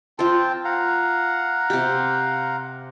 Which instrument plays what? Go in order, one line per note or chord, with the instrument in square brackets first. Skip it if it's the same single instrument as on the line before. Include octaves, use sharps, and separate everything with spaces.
[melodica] C4 G5 A5 [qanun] F4 C5
[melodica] F5 F#5 A#5
[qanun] C3 G4